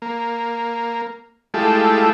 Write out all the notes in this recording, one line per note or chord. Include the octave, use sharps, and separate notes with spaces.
A#3
G#3 A3 E4 F4 G4 A4